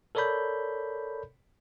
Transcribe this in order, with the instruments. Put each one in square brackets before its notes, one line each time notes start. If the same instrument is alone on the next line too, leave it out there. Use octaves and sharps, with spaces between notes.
[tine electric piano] A4 A#4 C#5 D5 B5 G6